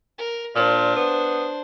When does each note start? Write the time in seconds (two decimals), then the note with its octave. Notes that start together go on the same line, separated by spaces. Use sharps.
0.18 A#4
0.55 A#2 D4 C5
0.96 B3